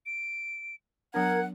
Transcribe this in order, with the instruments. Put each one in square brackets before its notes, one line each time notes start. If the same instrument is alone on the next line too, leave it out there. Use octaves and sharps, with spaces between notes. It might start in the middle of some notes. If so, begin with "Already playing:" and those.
[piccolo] D7
[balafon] F#3 B3 D4 [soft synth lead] A#4 [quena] F#5 [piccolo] G#6